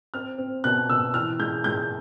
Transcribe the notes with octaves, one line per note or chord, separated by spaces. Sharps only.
C4 F6
C4
B2 F#6
B2 E6
E3 F6
G#3 G6
G#3 G6